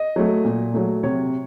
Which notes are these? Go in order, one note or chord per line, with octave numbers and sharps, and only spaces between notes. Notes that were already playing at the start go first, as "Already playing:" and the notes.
Already playing: D#5
F#3 A3
A#2
F#3 A3
C3 C#5